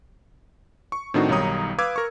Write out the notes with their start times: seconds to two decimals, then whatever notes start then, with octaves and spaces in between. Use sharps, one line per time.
0.92 C#6
1.14 A2 D#3 C4 D4 D#4 F#4
1.29 B1 D#3 G3 C#5 A#5 D#6
1.78 B4 F5 D6 E6 G#6
1.96 A#4 C#6